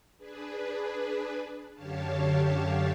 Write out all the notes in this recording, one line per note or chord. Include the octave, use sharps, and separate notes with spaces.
D4 G#4 B4
F#2 D3 G4 C#5 F5 A5